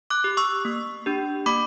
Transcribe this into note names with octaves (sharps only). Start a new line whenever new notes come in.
D6 F#6
G4
C#6 E6
A#3
D4 G4
A#3 B5 D6